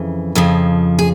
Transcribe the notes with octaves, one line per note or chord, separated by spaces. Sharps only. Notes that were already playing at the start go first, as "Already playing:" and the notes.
Already playing: F2 C#3 E3
F2 C#3 F3
G#4